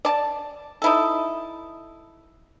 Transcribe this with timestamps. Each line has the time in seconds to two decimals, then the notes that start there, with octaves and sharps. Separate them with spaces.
0.05 D5 A5
0.82 D#4 E4 A4